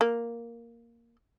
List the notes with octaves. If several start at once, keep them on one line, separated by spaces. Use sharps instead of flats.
A#3